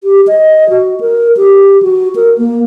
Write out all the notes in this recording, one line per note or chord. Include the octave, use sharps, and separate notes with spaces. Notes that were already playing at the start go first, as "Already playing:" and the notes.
G4
D#5
F#4
A#4
G4
F#4
A#4
A#3